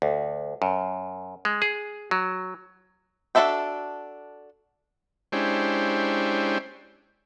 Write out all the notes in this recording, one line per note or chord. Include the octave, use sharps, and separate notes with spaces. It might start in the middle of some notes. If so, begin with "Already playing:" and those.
D2
F#2
G#3
G#4
F#3
D4 F#4 A4 E5 G5
G#3 C#4 D4 E4 G4 C5